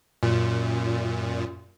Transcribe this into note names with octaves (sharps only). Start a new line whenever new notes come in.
F#2 A#2